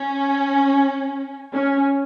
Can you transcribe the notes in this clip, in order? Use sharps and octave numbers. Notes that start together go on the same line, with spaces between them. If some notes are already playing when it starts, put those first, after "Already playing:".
Already playing: C#4
C#4